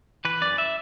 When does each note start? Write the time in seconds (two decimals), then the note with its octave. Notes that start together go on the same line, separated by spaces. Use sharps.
0.25 E3 B4
0.41 F#2 D5
0.58 E5